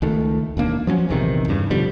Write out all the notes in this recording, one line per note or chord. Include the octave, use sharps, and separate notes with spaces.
C#2 D#3 A3
E1 D#2 A#3 D4
F3 F#3 B3 C#4
A#1 E2 C3 D#3
E2 G2 C#3
B2 D3 F3 G3